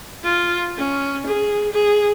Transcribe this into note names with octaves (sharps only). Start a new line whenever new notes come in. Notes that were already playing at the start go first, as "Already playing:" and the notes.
F4
C#4
G#4
G#4